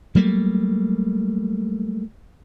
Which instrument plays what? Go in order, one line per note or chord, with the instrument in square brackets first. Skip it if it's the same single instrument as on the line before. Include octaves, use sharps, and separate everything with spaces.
[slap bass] F#3 G3 A3 A#3